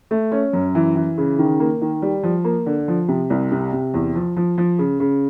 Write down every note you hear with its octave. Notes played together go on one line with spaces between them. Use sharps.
A3
C#4
F#2
E3
E3
C#3
D#3
A#3
D#3
G3
F3
A#3
D3
F3
C3
C2
C3
C3
E2
F3
F3
F3
C#3
C#3